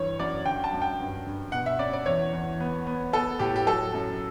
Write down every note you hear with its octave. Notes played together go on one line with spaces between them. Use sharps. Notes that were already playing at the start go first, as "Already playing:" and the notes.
Already playing: G2 E3 C#5
F#2 D5
D3 G5
A5
F#2
G5
G2
G2
B2 F#5
E5
C#4 D5
D5
E2 C#5
E2
B3
B3
B3 A4
A2 G4
G4
F#3 A4
F#2